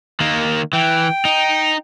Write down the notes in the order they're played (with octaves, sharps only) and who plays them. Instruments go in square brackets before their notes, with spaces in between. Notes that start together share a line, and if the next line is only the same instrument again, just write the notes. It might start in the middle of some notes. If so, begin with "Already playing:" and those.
[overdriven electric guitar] D#3 A#3
[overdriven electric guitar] E3 [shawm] G5
[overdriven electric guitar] D#4